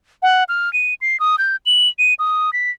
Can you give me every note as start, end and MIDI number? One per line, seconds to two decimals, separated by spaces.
0.23 0.44 78
0.49 0.72 89
0.73 0.94 99
1.01 1.19 96
1.20 1.36 87
1.38 1.56 91
1.66 1.88 102
1.99 2.14 99
2.19 2.53 87
2.53 2.71 95